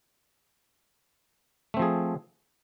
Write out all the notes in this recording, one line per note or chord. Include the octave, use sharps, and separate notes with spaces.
F3 A3 C4 G#4